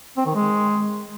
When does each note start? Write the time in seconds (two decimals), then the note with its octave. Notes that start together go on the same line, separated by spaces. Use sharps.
0.17 C4
0.26 D#3
0.35 G#3